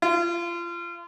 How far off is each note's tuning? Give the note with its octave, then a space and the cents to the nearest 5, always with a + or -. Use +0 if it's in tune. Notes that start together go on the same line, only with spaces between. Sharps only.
F4 -30